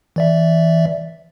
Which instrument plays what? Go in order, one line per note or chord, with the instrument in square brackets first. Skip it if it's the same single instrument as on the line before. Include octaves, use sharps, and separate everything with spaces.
[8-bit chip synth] E3 D5 E5